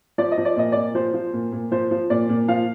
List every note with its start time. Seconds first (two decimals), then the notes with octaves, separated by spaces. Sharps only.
0.18 F3 D5
0.32 D#5
0.38 F3
0.45 D5
0.56 A#2 D#5
0.72 A#2 D5
0.95 F3 C5
1.14 F3
1.33 A#2
1.52 A#2
1.72 F3 C5
1.91 F3
2.10 A#2 D5
2.29 A#2
2.48 F3 F5